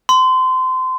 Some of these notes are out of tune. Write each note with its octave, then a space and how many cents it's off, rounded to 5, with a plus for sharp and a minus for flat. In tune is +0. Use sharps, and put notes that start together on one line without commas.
C6 -25